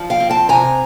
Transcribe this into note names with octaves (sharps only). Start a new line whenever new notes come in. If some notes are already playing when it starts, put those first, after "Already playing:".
Already playing: F3
F5 G5
C4
G5 A5
C3 G#5 A#5